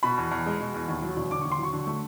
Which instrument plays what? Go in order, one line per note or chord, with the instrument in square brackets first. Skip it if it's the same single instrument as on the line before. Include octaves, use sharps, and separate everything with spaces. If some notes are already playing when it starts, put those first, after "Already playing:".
[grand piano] B2 B5
E2
E2
G#3
B2
E2
D#2
F#3
E1
D3 D6
D#2 C#6
C6
F#3 C#6
D3
A3